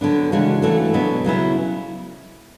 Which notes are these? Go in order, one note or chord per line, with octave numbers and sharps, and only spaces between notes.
D3 F#3 B3 D4
C#3 E3 G#3 D4 F#4
E3 A3 D4 F#4 A4
B2 F#3 B3 D4
C#3 F#3 B3 E4